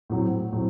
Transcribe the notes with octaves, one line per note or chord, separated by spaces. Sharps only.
A2 F#3 C4
A2 F#3 C4